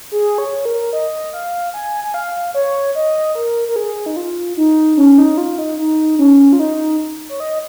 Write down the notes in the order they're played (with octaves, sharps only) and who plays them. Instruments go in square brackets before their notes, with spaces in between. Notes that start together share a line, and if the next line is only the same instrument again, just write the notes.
[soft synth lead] G#4
C#5
A#4
D#5
F5
G#5
G#5
F5
C#5
D#5
A#4
A#4
G#4
D#4
F4
D#4
C#4
D#4
F4
D#4
D#4
C#4
F4
D#4
C#5
D#5